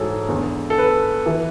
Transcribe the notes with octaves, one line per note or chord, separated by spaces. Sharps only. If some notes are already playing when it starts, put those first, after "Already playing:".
Already playing: G#2 E3 F#4 G#4 A4 C#5
E2 D3
A4
B4
E3